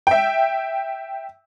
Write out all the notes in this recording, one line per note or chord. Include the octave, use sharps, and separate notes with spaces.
E5 G5